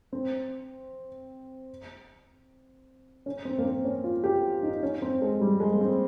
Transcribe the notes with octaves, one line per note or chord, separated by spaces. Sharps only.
C4
C#4
C4
A#3
C4
C#4
F4
G4
D#4
C#4
C4
G#3
G3
G#3
A#3
C4